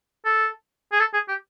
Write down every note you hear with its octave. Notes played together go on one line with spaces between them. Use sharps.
A4
G#4
A4
G#4
G4